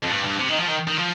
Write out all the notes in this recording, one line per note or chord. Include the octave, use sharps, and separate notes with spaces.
F2
G2
G2
C3
D#3
F3
D#3
D#3
F3